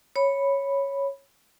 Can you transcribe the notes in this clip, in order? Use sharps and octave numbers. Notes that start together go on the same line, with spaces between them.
C#5 B5